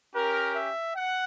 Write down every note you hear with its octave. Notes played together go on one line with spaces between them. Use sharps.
C#4 G4 A#4
E5
F#5